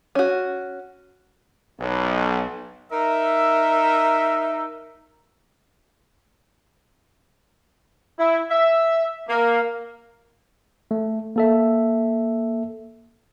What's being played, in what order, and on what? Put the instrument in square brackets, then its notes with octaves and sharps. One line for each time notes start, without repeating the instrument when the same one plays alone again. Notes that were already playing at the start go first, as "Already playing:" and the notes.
[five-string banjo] C#4 F#4
[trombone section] B1
[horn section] D#4 A#4 E5
E4
E5
A#3
[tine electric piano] A3
A#3 A4 E5